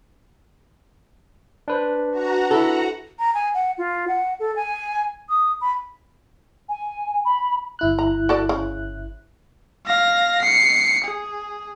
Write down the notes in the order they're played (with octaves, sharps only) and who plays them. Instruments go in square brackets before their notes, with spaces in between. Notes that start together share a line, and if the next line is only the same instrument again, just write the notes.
[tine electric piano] D4 B4 C5
[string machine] F#4 F#5 A#5
[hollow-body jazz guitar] E4 A4
[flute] A#5
G#5
F#5
F4
F#5
A4
G#5
D#6
B5
[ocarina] G#5
B5
[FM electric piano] G1 E4 F#6
[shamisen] A#5
F#4 A4 D5
C#3
[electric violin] F5 A#6
C7 C#7
G#4